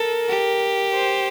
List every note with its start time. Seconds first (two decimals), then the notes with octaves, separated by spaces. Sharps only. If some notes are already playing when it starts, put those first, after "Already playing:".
Already playing: A4 A#4
0.29 G4
0.95 C5